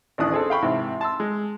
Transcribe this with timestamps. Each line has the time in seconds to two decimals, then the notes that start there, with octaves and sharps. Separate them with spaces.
0.18 A1 D#2 E3 D4 D#6 F#6
0.32 C4 G#4 A4
0.50 F5 G5 B5 C#6
0.62 G#2 C3 E3
1.01 A5 C6 E6
1.20 G#3